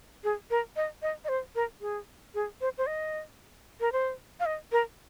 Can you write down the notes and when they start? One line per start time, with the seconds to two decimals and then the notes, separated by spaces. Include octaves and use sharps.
0.24 G#4
0.50 A#4
0.76 D#5
1.02 D#5
1.24 D#5
1.28 C5
1.55 A#4
1.81 G#4
2.34 G#4
2.61 C5
2.78 C5
2.87 D#5
3.80 A#4
3.92 C5
4.40 F5
4.45 D#5
4.72 A#4